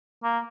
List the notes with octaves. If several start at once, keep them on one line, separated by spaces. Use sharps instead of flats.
A#3